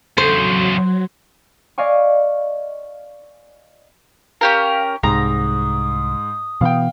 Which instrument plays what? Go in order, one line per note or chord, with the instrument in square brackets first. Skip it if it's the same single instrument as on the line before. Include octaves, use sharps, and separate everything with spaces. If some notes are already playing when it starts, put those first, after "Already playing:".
[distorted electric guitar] E2 C#3 [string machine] F#3 [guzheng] C5
[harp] D5 D#5 F5 G#5 C#6
[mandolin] C#4 G4 A#4 [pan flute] F5
[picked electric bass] C2 [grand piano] G#2 [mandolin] A#5 [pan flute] D#6
[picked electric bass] B2 E3 B3 [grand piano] F5 G5